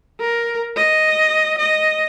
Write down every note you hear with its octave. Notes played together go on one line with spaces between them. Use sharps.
A#4
D#5
D#5